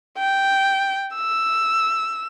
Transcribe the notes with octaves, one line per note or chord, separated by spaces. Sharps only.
G5
E6